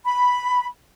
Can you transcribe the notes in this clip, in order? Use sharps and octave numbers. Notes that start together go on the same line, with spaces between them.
B5